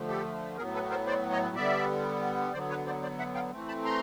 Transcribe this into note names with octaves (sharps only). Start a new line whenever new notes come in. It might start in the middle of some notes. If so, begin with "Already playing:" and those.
Already playing: D3 F3 A3
G4 A4
A2 F#3 B3 G#4 A#4
A4 B4
A#4 C5
C5 D5
C#5 D#5
D3 G3 B3 D5 E5
D3 F#3 B3 C5 D5
B4 C#5
C5 D5
C5 D5
E5 F#5
F5 G5
E3 A3 C4
A5 B5
A#5 C6